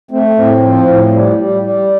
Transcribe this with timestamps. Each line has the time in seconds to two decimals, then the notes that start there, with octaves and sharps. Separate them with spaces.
0.11 A3 C4
0.36 A2 C4
0.61 F3
0.86 A2
1.11 G3
1.36 G3
1.62 G3